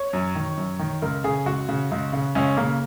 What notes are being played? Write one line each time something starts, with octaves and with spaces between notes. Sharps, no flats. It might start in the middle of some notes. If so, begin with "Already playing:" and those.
Already playing: C#5
F#2
D#3
F#2
D#3
C#2 A#4
C#3 G#4
C#2 F#4
C#3
C#2
C#3
C#2 C#4
C#3 A#3